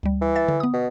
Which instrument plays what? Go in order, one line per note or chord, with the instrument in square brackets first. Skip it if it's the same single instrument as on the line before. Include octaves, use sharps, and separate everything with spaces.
[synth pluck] D2 G3
[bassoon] E3
[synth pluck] E5 A6
D3
B3 D#6
[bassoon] B2